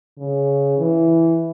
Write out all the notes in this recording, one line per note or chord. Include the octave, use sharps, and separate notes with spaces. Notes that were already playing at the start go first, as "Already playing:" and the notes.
C#3
E3